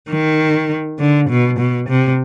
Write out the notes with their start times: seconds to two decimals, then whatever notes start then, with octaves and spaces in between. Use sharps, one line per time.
0.10 D#3
0.99 D3
1.29 B2
1.59 B2
1.89 C3